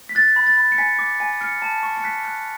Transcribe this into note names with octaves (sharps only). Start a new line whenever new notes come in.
B6
F#6 A6
B5
A6
B5
C#7
G#5 B6
D6
G#5
F6 C#7
A5
C#6
C#7
F#6 B6
F#6